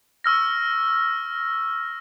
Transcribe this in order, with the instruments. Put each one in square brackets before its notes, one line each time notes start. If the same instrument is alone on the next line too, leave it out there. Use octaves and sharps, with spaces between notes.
[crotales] C#6 E6 F6 A#6